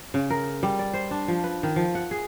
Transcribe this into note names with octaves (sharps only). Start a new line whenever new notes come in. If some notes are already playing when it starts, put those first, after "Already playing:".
C#3
A#4
G3
D5
C5
D4
F3
B4
D#3
F3
F#5
G#4